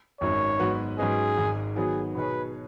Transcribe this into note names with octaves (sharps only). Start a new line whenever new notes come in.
G#1 F#2 D#3 C#5
G#2 F#3 B3 F#4 B4
G#2 F#3 C#4 G#4 B4 D#5
G#1 G#2 G#3
D#3 F#3 B3 F#4 G#4
B2 F#3 D#4 G#4 B4 C#5